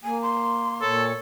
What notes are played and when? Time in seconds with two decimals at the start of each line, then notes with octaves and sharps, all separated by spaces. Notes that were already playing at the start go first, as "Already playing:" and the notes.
0.04 A#3 G#5
0.22 C6
0.82 A#2 A4 C#5